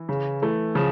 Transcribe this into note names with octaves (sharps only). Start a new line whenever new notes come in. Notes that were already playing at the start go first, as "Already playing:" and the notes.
Already playing: E3
C#3
E3 A3
C#3 F3